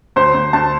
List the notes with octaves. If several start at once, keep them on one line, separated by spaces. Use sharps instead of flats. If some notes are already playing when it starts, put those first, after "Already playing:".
D2 C5
D2
D2 A5